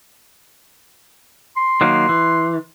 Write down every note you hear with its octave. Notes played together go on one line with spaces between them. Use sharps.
C6
D#3 F#3 A#3
E3